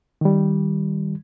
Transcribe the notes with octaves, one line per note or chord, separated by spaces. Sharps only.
D#3 G3